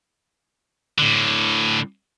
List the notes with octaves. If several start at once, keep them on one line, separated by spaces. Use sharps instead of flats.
A2 D3